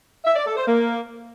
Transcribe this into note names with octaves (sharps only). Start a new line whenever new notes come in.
E5
D5
A4
C5
A#3